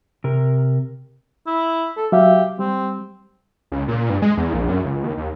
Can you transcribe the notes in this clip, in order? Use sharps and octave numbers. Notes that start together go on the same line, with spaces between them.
C3 A#4
E4
A4
F#3 G4 E5 F5
G3 C4
C#2
A#2
G2
G#3
E2
A#1
F#2
C#2
D#2
D#2